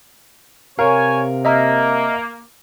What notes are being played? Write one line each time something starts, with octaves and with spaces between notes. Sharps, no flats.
C3 A#4 C#5 F5 G#5
A#3 D#5 E5 A#5